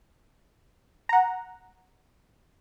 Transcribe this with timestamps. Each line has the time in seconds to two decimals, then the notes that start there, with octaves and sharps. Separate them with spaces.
1.09 F#5 A#5